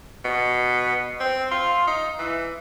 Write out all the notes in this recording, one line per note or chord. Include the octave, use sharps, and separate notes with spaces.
B2
C4
F4
D#4
E3